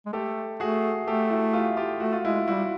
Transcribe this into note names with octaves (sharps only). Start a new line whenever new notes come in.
G#3
A3 G4 A4
A3 F#4 G#4
A3 G4 A4
E4 F#4
F4 G4
F4 G4
A3 F#4
F4
G#3 E4 F#4
G3 E4 F#4